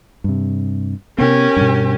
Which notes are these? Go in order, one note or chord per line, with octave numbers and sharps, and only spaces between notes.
G2 C3
C3 B3 C#4 G4 A#4
G2 B2